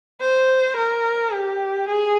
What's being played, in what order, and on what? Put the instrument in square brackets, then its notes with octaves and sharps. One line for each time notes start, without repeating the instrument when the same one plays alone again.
[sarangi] C5
A#4
G4
G#4